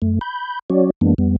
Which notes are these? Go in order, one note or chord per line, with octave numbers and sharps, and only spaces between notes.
F#2 A3
B5 G6
F#3 C#4 F#4 C#5 D5
F#2 E3 G#3 A#3 B3 D4
F2 G3 B3